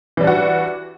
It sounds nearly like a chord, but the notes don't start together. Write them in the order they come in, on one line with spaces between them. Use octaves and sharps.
E3 G3 D4 F#4